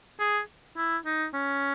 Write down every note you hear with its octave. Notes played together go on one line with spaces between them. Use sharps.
G#4
E4
D#4
C#4